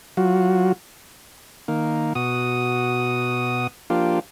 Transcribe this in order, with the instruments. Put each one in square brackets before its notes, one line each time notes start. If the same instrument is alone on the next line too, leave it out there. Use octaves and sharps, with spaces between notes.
[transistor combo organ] F#3 F4 F#4
D#3 A#3
B2 F#4 D#6
F3 A#3 D4 F4 G4